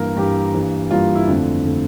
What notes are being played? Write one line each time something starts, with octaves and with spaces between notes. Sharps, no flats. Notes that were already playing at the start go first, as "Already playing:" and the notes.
Already playing: G2 E3 A#3 A#4
G2 E3 A#3 G4
G2 E3 G3 A#3
G2 E3 G3 A#3 F4
E4
F2 D3 A3 C4
D3 A3 C4